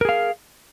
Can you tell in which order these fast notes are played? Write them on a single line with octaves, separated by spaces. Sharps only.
A#4 G#4 F5